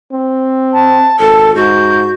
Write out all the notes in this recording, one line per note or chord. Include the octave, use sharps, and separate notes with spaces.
C4
A5
G#1 A4 A5
G#2 F#4 G6